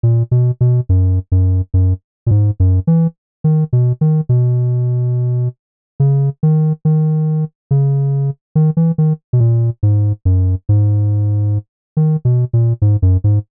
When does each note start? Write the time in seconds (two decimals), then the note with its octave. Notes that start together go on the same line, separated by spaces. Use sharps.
0.03 A#2
0.31 B2
0.61 B2
0.89 F#2
1.32 F#2
1.74 F#2
2.27 A#2
2.31 G#2
2.60 F#2
2.87 E3
3.44 D#3
3.73 B2
4.01 D#3
4.29 B2
6.00 C#3
6.43 D#3
6.85 D#3
7.71 C#3
8.55 D#3
8.77 E3
8.98 D#3
9.33 B2
9.40 A#2
9.83 G#2
10.25 F#2
10.69 G#2
11.97 D#3
12.25 B2
12.53 A#2
12.82 G#2
13.02 F#2
13.24 G#2